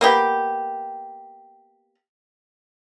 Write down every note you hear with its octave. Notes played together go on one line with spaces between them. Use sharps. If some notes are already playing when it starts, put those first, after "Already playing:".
A#3 B3 G4